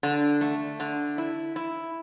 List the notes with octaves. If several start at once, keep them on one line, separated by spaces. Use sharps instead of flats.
D3
A3
D3
E4
E4